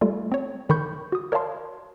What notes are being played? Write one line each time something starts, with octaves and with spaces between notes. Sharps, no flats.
G3 A3 F4 A4
C4 C#5
D3 D#3 B5 C#6 G6
F#4 D#6
A#4 C#5 D5 F5 A5 C6